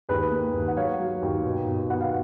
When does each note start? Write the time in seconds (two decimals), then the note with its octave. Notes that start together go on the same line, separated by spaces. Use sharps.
0.09 D#2 G#4 B4
0.31 A#3
0.54 D#2
0.68 F#5
0.76 F#3 C#5 F5
0.99 F#3
1.22 D#2
1.45 B2
1.66 B2
1.90 B3 F#5
2.01 F5